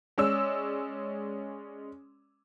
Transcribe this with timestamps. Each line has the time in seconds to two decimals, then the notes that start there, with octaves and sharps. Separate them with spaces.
0.18 G#3 C#4 D5 E6